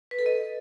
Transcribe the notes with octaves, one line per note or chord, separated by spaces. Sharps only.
B4
A4
D#5